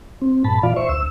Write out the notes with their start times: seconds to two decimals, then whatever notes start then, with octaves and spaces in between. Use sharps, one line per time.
0.22 C4
0.44 G2 A#2 A5 B5
0.63 A#2 E3 F4 D5 F5
0.76 C5 E5 C#6
0.89 D2 E6